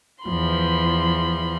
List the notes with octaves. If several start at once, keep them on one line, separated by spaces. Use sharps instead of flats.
E2 F3 B5 C6